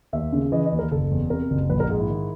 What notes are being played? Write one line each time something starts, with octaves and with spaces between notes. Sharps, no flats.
D#2 E5
C#3
E3 D#5
D#5
D#2
A#4
F#1 A4
E2
C3 A#4
F#1
A#1 B4
A#4
G#2 G#4
E4
D#3